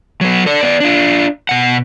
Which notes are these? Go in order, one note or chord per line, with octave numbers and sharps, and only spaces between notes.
F#3 B3
A4 D5
B3 D5
D4 F4
B2 F#5